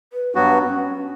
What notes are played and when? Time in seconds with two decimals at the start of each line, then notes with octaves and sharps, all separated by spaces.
0.13 B4
0.35 G2 F#3 B3 D4 F#4
0.64 B3
0.69 C#4